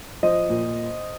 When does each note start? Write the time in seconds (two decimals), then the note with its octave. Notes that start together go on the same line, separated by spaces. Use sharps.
0.23 F3 C5 D#5
0.49 A#2